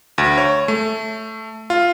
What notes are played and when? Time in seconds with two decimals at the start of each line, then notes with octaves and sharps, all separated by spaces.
0.18 D2
0.38 C#5
0.68 A3
1.70 F4